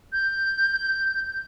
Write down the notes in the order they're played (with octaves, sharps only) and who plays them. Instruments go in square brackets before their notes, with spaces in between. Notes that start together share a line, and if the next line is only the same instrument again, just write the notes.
[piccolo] G6